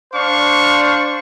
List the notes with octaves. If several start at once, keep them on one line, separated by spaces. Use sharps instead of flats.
D4 C5 D5 F5 C#6